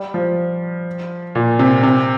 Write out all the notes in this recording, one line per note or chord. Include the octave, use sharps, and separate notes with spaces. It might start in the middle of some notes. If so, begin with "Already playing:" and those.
Already playing: G3
F3
A#2
C3
C3